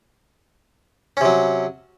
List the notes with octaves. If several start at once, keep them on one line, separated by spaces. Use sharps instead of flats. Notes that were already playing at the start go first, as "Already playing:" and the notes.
C3 F#3 C#4